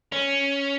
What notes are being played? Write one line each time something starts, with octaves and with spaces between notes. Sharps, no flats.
C#4